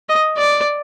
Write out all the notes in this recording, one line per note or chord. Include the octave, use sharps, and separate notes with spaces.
D#5
D5